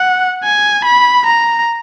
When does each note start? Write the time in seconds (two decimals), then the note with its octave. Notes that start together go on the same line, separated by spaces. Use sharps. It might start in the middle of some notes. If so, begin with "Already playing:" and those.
Already playing: F#5
0.44 G#5
0.85 B5
1.26 A#5